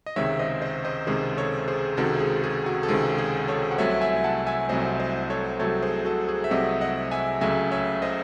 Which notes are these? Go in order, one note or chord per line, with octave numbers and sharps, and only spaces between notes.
D#5
C#2 C3 D#3 G#3 C#5 E5
C5 D#5
C5 D#5
C5 D#5
C#2 C3 D#3 G#3 G#4 C5
A4 C#5
G#4 C5
C#2 C3 D#3 G#3 F#4 A4
G#4
G#4
F#4
A4
C#2 C3 D#3 G#3 G#4
G#4 C5
A4 C#5
F#5
C2 C3 F#3 A3 C#5 E5
F#5
E5 G#5
F#5 A5
E5 G#5
C2 C3 F#3 A3 C5 D#5
C5 D#5
A4 C#5
C2 C3 F#3 A3 A4 C#5
G#4 C5
F#4 A4
G#4
E5
C2 C3 F#3 A3 D#5 F#5
D#5 F#5
E5 G#5
C#2 C#3 F#3 A3 E5 G#5
C#5 E5
C5 D#5